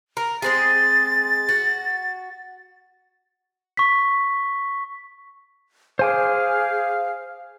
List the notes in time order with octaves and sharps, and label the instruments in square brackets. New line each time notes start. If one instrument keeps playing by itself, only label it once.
[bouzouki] A#4
[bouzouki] G#3 C4 G#4 [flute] A6
[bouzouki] F#4
[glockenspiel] C#6 B6
[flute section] G#4 F5 [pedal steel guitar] C5 G#5 D6